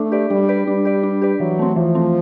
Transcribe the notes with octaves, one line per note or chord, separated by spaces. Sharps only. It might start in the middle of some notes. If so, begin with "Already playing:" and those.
Already playing: A3 D4
G4 B4 D5
G3 D4
G4 B4 D5
G3 D4
G4 B4 D5
D4
G4 B4 D5
E3 F#3
A3 C4
E3 F3
A3 C4